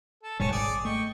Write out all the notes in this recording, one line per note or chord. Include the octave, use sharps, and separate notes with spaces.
A4
D#1 G#2 G3 C#5 G#5 A5
G#1 G#4 D5
A3 D#5 G5 C#6